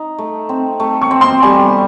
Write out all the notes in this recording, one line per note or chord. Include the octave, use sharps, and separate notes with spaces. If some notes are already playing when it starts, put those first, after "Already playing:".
Already playing: D#4
A3
C4
A3
C#6
C4
C6
G3 G#5